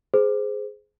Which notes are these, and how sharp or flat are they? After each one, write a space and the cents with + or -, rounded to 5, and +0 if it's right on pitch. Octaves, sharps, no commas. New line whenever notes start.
G#4 +10 C5 -15